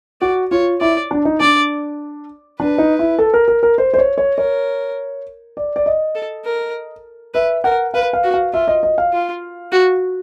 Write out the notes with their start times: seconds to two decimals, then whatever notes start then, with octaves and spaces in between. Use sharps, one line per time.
0.21 F#4 D5
0.51 F4 C#5
0.81 E4 D5
1.11 D4
1.25 D#4
1.40 D4 D5
2.60 D4 B4
2.78 D#4
2.99 E4
3.19 A4
3.34 A#4
3.48 A#4
3.63 A#4
3.78 C5
3.94 C5
3.98 C#5
4.18 C#5
4.38 A#4 C#5
5.57 D5
5.76 D5
5.86 D#5
6.15 A4
6.45 A#4
7.34 B4 E5
7.64 A#4 F#5
7.94 B4 F5
8.13 F5
8.24 F#4
8.34 F5
8.53 F4 E5
8.68 D#5
8.83 D#5
8.98 F5
9.13 F4
9.72 F#4